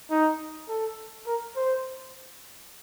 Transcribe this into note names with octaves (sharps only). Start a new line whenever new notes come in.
D#4
A4
A#4
C5